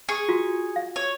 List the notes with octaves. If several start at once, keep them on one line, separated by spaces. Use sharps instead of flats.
G#4 C#6
F4 F#4
F5
C#5